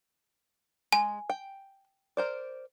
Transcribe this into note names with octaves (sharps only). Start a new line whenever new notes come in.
G#3 G#5
G5
A#4 C5 D5